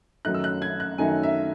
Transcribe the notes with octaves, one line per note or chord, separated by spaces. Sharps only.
F#2 D#3 F#3 A3 D#4 F#6
E6
F#6
G#6
F#6
F#2 D#3 F#3 A3 D#4 G#5
E5